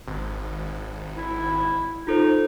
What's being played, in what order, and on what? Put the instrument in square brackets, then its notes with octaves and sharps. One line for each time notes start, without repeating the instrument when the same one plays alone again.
[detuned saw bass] G#1
[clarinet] E4
[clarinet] D#4 [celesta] F4 A4 C5